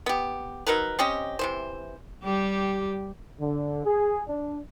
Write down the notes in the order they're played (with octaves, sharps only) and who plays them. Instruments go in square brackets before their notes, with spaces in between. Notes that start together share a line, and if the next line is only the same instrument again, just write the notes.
[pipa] B3 G4
F#3 D#4 A#4 B4
C4 C#4 G4 D#5
C3 E3 C5
[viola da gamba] G3 G4
[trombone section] D3
G#4
D4